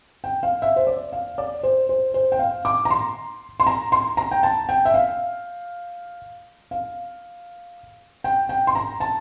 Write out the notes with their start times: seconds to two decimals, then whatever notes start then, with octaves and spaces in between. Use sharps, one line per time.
0.24 G5
0.43 F5
0.62 E5
0.76 C5
0.87 D5
1.12 F5
1.38 D5
1.63 C5
1.89 C5
2.14 C5
2.32 G5
2.39 F5
2.65 D6
2.85 A#5
2.91 C6
3.60 C6
3.67 A#5
3.92 C6
4.17 A#5
4.31 G5
4.43 A5
4.69 G5
4.85 E5
4.94 F5
6.71 F5
8.24 G5
8.49 G5
8.67 C6
8.75 A#5
9.00 A5